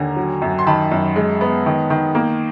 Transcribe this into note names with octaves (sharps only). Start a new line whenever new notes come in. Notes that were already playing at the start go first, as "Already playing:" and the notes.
Already playing: D#2 D3 G#5 A#5
F#3
F#2
C6
D#3 A5 B5
F#2
G#3
B3
D#3
D#3
A#3